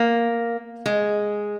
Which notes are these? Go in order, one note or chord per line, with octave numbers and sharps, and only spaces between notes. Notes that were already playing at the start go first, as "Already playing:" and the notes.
Already playing: A#3
G#3